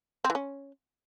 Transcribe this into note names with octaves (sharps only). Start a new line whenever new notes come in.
C4
E3
C#4